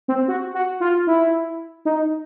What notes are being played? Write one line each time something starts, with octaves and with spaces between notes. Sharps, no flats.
C4
F#4
F#4
F4
E4
D#4